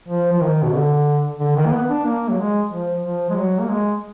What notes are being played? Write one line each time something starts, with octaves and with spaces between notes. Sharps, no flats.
F3
F3
D#3
B2
D3
D3
D#3
A#3
B3
D4
A#3
F#3
G#3
F3
F3
G#3
F#3
A#3
G#3